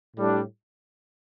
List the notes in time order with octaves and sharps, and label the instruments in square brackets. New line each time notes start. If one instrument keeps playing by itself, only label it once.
[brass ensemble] A2 G3 D4